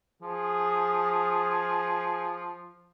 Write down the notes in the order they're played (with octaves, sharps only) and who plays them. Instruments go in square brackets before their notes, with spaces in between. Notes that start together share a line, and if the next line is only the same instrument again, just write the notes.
[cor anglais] F3 [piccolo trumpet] G#4